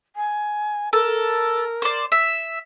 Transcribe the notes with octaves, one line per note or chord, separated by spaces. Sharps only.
G#5
A4 A#4
C5 D5
E5